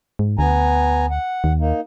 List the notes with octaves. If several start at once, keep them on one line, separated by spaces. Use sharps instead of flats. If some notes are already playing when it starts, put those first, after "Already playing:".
G#2
D2 B3 G#5 A#5
F#5
D#2
A#3 D#4